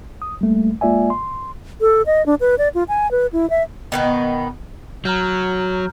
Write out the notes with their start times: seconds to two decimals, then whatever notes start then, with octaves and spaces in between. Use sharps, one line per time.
0.22 D#6
0.41 G3 A3 A#3
0.81 G#3 A#3 F4 D5 E5 G#5
1.10 C6
1.81 A4
2.06 D#5
2.26 D4
2.40 B4
2.58 D5
2.75 F4
2.89 G#5
3.11 B4
3.33 E4
3.50 E5
3.92 B2 D#3 B3
5.05 F#3 A#5 F6 G6